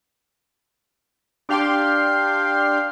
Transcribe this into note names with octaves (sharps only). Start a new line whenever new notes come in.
D4 G4 F5 G5 C6